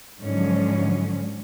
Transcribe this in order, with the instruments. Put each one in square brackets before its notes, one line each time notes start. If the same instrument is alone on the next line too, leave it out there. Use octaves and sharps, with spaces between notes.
[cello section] G#2 D3 F3 F#3 C#4